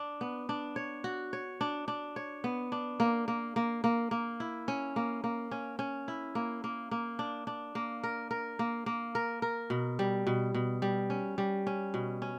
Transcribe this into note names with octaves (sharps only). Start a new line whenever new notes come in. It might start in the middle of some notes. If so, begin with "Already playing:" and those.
Already playing: D4
B3
D4
C#5
F#4
C#5
D4
D4
C#5
B3
D4
A#3
A#3
A#3
A#3
A#3
E4
C#4
A#3
A#3
C#4
C#4
E4
A#3
A#3
A#3
D4
D4
A#3
A#4
A#4
A#3
A#3
A#4
A#4
B2
G3
B2
B2
G3
C#4
G3
C#4
B2
C#4